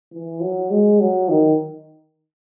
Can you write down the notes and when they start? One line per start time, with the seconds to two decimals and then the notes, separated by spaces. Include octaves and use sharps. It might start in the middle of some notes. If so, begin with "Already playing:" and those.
0.12 E3
0.41 F#3
0.70 G#3
1.00 F#3
1.29 D#3